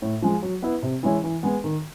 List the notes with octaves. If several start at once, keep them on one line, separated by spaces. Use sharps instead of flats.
A2
F3 G#3
F#3
B3 E4
C3
E3 G#3 C#4 E4
E3
G#3 B3
D#3